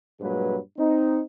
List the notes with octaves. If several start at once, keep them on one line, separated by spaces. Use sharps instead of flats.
G2 A#2 F#3 G#3 B4
C4 D#4